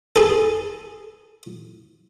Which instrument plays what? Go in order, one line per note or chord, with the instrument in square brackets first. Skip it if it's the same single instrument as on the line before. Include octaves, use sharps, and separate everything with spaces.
[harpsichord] G#4 A4